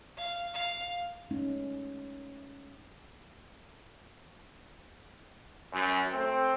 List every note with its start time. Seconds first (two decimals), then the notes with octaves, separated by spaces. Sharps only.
0.18 F5
0.54 F5
1.31 G#3 A3 C#4 D#4
5.72 F#2
6.12 A3 C4